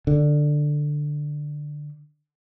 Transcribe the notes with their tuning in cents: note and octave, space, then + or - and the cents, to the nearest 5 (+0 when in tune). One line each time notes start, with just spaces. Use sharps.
D3 +10